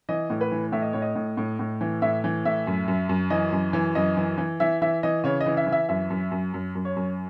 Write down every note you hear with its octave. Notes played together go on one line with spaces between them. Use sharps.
E3 D#5
A2
B4
E3
A2 E5
D#5
A2 C#5
D#5
A2
A2
A2
E3
A2 E5
E3
A2 E5
F#2
F#2
F#2
E3 D#5
F#2
E3
F#2 D#5
E3
E3
E3 E5
E3 E5
E3 D#5
C#3 C#5
D#5
E3
E5
E3
E5
F#2 E5
F#2
F#2
F#2
F#2
C#5
F#2